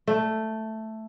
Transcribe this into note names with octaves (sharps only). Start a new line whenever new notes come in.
A3